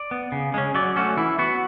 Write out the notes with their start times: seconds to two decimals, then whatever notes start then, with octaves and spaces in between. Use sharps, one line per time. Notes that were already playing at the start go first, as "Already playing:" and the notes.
Already playing: D5
0.11 B3
0.32 C#3
0.54 G#3 C#4
0.74 F#3 D5
0.96 A3 C#4 F#4
1.17 E3 E4
1.39 B3 F#4